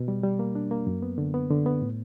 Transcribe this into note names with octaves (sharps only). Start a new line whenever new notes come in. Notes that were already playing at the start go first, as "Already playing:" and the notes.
Already playing: B2
G3
G3
A#3
D4
A#3
F#2
B3
D3
B3
D3
B3
A2